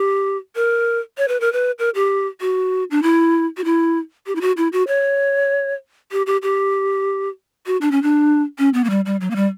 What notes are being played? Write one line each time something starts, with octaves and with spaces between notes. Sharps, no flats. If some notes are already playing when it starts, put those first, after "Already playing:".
Already playing: G4
A#4
C#5
B4
A#4
B4
A#4
G4
F#4
D4
E4
F#4
E4
G4
E4
F#4
E4
F#4
C#5
G4
G4
G4
F#4
D4
C#4
D4
C#4
B3
A#3
G3
G3
F#3
A#3
G3